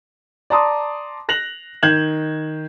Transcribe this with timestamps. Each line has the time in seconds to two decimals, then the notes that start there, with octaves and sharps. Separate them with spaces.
0.50 D5 A5 A#5 C6 D6 D#6
1.29 F#6 A#6 F7 F#7
1.83 D#3 G6 G#6 E7 F#7